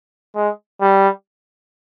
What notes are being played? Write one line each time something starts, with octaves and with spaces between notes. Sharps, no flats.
G#3
G3